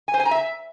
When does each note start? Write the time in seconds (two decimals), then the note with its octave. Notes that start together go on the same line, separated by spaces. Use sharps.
0.08 G#5
0.14 C5
0.20 G#5
0.25 A#5
0.31 E5